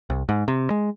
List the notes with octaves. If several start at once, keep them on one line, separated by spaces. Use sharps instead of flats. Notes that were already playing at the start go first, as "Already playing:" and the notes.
C2
G#2
C3
G#3